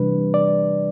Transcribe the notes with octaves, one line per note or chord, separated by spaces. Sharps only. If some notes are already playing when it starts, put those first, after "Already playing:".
Already playing: C3 E3 G3 D4 B4
D5